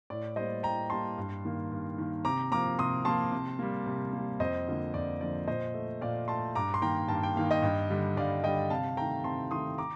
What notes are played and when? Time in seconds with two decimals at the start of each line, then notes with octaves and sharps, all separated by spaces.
0.10 A2 D5
0.36 G3 A#3 C5 D#5
0.63 A2 G5 A#5
0.90 G3 A#3 A5 C6
1.18 G2
1.45 D#3 A#3
1.71 G2
1.98 D#3 A#3
2.25 C3 A#5 D6
2.51 F3 A#3 A#5 D6
2.79 C3 C6 D#6
3.05 F3 A#3 A5 C6
3.32 C3
3.59 G3 A#3
3.86 C3
4.13 G3 A#3
4.40 F2 C5 D#5
4.68 D3 F3 A#3
4.94 F2 D5
5.20 D3 F3 A#3 D5
5.47 A#2 C5 D#5
5.74 A3
6.01 A#2 D5 F5
6.28 A3 A5 C6
6.55 G2 A#5 D6
6.74 C6
6.82 D#3 A#3 G5 A#5
7.08 G2 A5
7.23 G5
7.36 D#3 A#3 F5
7.51 D#5 G5
7.62 G2
7.90 D3 G3
8.16 G2 D5 F5
8.43 D3 G3 D#5 G5
8.70 C3 F5 A5
8.97 D#3 A3 G5 A#5
9.24 C3 A5 C6
9.51 D#3 A3 C6 D#6
9.78 A#5 D6